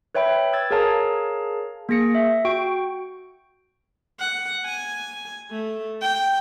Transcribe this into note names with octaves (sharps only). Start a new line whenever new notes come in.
B4 C#5 E5 G5 B5
E6 G#6 A6
G#4 A#4 C#5 F5 A5 A#5
A#3 G#4 A#6 C#7
E5
F#4 G5 C#6 D7
F#5
G#5
A3
G5